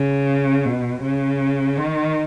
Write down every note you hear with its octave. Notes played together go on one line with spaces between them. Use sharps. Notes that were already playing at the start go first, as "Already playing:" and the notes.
Already playing: C#3
B2
C#3
D#3